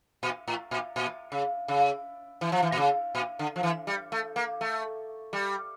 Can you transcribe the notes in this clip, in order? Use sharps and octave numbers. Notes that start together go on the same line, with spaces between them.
A#2
A2
A#2
A#2
C#3
C#3
E3
F3
E3
A#2
C#3
A#2
D3
F3
E3
G3
A3
A#3
A3
G3